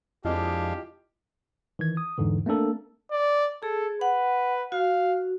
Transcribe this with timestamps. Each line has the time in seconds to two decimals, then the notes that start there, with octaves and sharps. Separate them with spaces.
0.25 F2 G#3 D4 E4 F4 G4 D#5 F5
1.79 D#3 E3 G#6
1.97 D#6
2.18 E2 G#2 D3 E3
2.46 A3 A#3 C4 D4 A4 A#4
3.11 D5
3.63 G#4 A4
4.01 B4 F#5
4.72 F#4 F5